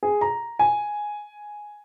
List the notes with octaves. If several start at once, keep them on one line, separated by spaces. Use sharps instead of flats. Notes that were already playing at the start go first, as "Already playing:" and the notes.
G#4
A#5
G#5